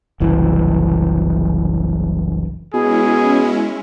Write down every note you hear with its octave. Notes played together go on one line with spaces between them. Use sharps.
F#1 C2 E3
B2 G#3 C#4 E4 G#4